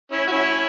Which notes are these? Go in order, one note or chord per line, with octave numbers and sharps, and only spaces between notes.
C#4 E4
F#4
C#4 E4